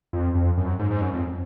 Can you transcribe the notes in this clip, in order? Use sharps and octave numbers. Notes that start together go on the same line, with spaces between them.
F2
F2
F#2
G#2
G#2
F#2
F2